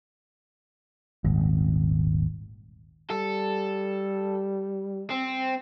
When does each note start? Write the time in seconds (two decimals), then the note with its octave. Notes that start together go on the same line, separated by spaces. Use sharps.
1.24 D#1 G#1
3.10 G3 A4
5.10 C4